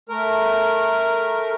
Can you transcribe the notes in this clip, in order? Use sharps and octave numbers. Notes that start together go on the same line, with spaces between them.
A3 A#4